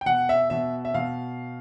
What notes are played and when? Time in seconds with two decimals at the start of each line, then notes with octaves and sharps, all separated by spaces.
0.01 G5
0.06 B2 F#5
0.29 E5
0.50 B2 E5
0.85 E5
0.94 B2 F5